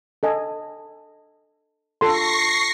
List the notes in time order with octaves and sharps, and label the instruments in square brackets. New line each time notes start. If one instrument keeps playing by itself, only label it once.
[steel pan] A4 D#5 G#5
[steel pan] F4 A4 C6 [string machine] C#6 A#6 C7